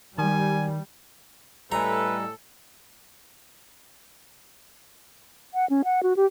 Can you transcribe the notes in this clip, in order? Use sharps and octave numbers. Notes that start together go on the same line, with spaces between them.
D#3 G3 G#5
A2 G3 A4 B4 D#5 G#5 A#5
F#5
C#4
F#5
F#4
G4